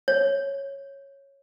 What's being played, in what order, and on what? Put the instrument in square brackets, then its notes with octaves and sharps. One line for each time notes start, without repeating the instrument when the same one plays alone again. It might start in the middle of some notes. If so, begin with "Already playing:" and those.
[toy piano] C#5